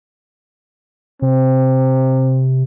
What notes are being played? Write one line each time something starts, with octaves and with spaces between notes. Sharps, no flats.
C3 C4